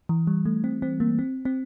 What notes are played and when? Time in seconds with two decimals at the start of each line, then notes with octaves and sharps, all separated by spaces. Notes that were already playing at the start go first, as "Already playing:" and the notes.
0.09 E3
0.27 G3
0.45 A3
0.64 C4
0.82 C4
1.00 A#3
1.19 C4
1.45 C4